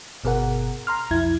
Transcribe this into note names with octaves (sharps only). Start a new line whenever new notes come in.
G1 B2 G#4 A#4 F#5
A#5 C6 F6
B1 F2 E4 G#6